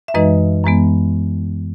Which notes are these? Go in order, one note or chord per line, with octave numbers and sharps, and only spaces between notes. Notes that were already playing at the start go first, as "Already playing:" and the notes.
E5
F#2 E3 G#3 D#4 B4 D#5
F#2 E3 G#3 B3